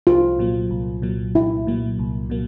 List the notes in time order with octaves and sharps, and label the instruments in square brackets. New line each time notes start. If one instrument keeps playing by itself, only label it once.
[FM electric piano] C2 [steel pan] F4
[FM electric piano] A#2 F#3 A#3
C2
A#2 F#3 A#3
[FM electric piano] C2 [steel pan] E4
[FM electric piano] A#2 F#3 A#3
C2
A#2 F#3 A#3